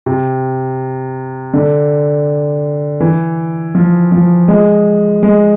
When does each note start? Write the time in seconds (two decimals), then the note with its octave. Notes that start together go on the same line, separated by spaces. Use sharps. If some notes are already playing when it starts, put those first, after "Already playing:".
0.06 C3
1.53 D3
3.00 E3
3.75 F3
4.12 F3
4.48 G#3
5.23 G#3